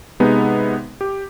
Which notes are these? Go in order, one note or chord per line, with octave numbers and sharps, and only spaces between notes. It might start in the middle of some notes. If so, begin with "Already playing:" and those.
C3 G#3 B3 D#4
G4